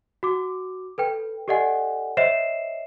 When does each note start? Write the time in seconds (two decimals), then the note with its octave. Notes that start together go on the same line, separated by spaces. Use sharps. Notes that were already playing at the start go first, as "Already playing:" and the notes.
0.23 F#4 D6
0.98 A4 B4 G5
1.48 G4 A4 D5 D#5 F#5 G#5
2.17 C5 C#5 D#5 E5 C7 E7